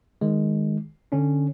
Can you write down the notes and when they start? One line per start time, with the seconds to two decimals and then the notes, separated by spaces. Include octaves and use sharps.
0.21 D#3 G#3
1.12 D3 C#4 D4